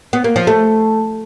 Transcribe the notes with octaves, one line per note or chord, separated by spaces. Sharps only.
B3
A#3
F3
A3